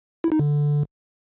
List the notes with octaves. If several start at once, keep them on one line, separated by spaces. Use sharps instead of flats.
E4
D#4
D3